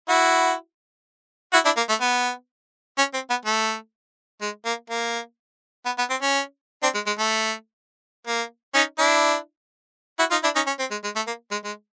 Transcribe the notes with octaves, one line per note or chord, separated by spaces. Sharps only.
E4 F#4
E4 F#4
D4 E4
A#3
A3
B3
C#4
C4
B3
A3
G#3
A#3
A#3
B3
B3
C4
C#4
C4 D4
G#3
G#3
A3
A#3
C#4 D#4
D4 E4
E4 F#4
D#4 F4
D4 E4
C#4 D#4
C#4
C4
G#3
G#3
A3
A#3
G#3
G#3